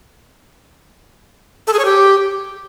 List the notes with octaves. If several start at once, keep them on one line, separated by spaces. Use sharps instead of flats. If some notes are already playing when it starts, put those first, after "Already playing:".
A4
G#4
C#5
G4